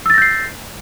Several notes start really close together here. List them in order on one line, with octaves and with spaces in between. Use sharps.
E6 A6 A#6 G6 C7